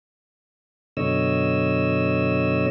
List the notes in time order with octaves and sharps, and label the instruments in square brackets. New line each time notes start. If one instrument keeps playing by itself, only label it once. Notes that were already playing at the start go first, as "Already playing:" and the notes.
[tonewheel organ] F#2 B2 D3 C#5 D#5 E6